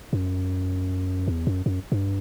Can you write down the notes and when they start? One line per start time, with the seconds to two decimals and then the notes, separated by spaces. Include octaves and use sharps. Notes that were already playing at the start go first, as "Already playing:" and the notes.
0.13 F#2
1.28 E2
1.47 F#2
1.66 F#2
1.92 G2